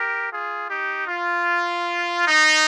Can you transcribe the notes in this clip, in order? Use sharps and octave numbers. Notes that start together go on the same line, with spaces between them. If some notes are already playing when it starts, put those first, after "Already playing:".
Already playing: G4 A#4
F4 G#4
D#4 G4
F4
D#4